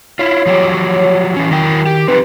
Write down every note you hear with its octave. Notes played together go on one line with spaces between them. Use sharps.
E4 F4 C#5
F3 F#3 G4
E3 C#4
D#3 F#3 E4 G5
G4
C4 D#4 G4 B4